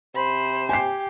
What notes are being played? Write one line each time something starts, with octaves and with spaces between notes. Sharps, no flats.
C3 C5 B5
G4 G#5 C7